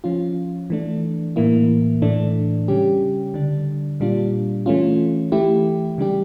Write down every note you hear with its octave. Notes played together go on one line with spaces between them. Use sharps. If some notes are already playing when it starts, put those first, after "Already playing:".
F3 C#4 F4
E3 A3 D4
A2 E3 A#3 E4
A2 E3 A3 D4
C#3 G3 C#4 G4
D3 G3 D4
A#2 G3 D4 F4
E3 A3 C#4 F4
E3 A3 E4 G4
C#3 G3 D4 G4